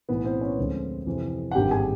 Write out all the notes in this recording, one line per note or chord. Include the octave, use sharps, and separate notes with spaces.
B1 A2 E3 B3 B4
C4 C5
C#4 C#5
D2 D3 F3 G#3 C4
F2 C3 E3
F#5
G#1 G2 D3 G4 G5
G#4 G#5